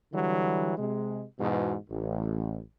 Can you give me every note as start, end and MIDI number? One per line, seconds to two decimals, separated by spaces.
0.12 0.73 50
0.12 0.73 52
0.12 0.73 54
0.12 0.73 55
0.77 1.23 48
0.77 1.23 56
1.38 1.74 40
1.38 1.74 44
1.38 1.74 47
1.88 2.57 33